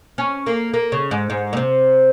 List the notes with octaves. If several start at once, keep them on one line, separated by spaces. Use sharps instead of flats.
C#4
A#3
A#3
C#3
G#2
G#2
A#2
C3